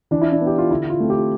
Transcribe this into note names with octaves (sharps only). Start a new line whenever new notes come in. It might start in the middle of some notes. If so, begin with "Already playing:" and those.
E3 D4
E4
D4
B3
G4
F4
D3 E4
F4
A3 C4
G4